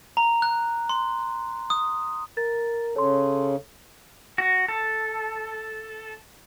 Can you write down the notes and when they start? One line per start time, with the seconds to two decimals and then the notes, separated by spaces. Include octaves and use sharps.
0.17 A#5
0.42 F#6
0.89 C6
1.70 D#6
2.37 A#4 A6
2.96 C#3 A4 C#5 C6
4.38 F#4
4.68 A4